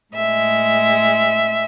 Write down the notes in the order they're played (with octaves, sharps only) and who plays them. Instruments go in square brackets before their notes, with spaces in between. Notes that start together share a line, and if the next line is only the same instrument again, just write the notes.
[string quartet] A2 G#3 E5